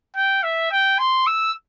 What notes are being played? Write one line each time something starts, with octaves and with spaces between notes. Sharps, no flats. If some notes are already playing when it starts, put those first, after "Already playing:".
G5
E5
G5
C6
E6